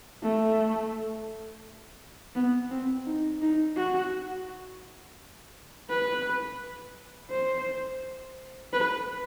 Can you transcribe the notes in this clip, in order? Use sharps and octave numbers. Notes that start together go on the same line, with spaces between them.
A3
B3
C4
D#4
D#4
F#4
B4
C5
B4